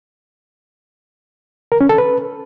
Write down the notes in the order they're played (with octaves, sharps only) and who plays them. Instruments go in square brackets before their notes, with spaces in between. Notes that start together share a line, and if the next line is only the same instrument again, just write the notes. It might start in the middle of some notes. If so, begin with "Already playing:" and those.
[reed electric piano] A#4
C#4
A4
B4